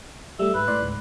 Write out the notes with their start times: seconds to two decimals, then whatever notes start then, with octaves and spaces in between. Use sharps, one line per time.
0.39 G3 A3 E5
0.55 G#2 B4
0.68 A2 D5 C6
0.83 C#2 G#2